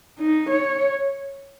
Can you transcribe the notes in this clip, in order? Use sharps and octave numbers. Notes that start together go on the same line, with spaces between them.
D#4
C#5